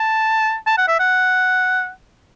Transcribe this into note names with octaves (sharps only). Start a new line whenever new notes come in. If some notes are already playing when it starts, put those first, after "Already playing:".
Already playing: A5
A5
F#5
E5
F#5